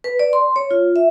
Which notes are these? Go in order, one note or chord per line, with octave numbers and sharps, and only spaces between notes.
B4
D5
C6
C#5
F4
E5